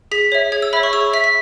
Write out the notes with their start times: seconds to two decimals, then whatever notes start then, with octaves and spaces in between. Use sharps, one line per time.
0.11 G#4 B6
0.32 C#5 E5
0.52 G#4 G#6
0.62 E6
0.73 C#5 E5 B5
0.83 C#6
0.93 G#4 E6
1.13 E5 B6
1.24 B6